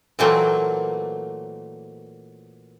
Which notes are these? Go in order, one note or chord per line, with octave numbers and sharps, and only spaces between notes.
A#2 E3 F#3 A3 A#3 C4